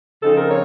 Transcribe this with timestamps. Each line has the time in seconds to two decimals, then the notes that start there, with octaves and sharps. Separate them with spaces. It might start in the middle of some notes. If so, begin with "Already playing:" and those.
0.21 C#3 F3 C4 D#4 A4
0.35 A#4
0.49 C#5